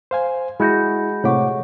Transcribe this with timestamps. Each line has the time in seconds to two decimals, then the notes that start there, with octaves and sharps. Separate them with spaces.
0.11 C5 F5 G#5
0.60 G#3 E4 F#4 B5 G6 A#6
1.24 A2 C3 C#5 F#5 C#6 D6